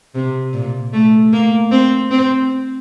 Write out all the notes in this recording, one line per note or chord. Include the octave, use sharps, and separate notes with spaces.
C3
A#2
A3
A#3
C4
C4